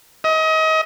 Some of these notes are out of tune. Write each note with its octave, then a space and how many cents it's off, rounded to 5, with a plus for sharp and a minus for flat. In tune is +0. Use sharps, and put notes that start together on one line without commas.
D#5 +30